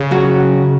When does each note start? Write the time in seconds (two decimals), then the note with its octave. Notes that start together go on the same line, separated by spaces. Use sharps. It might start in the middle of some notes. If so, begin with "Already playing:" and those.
Already playing: C#3
0.11 F#3 F#4